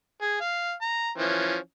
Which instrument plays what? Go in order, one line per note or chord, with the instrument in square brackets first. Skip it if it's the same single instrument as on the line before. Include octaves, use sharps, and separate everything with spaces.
[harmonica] G#4
F5
A#5
E3 F3 C#4